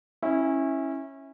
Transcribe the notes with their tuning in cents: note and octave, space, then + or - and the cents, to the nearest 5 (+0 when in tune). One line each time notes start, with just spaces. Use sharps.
C#4 -20 E4 -15